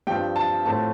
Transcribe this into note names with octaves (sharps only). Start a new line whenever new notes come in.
G2 F3 C4 G5
A5
A2 F3 A3 C4 A5